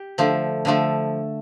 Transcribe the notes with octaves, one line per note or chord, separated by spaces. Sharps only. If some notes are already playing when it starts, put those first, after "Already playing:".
Already playing: G4
D3 F3 A3
D3 F3 A3